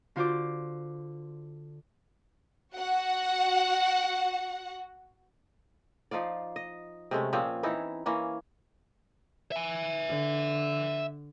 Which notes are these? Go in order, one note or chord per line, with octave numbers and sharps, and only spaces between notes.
D3 F4 F#4 C5 D5 D6
F#4 F#5
F3 D#4 F4 D5
D#5
C3 G#3 A3 C#4
A#2 F3 C4 C#4
E3 D#4 E4
E3 A#3 C#4
E5 G#5
D3